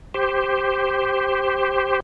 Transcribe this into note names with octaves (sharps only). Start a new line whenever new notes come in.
G4 C5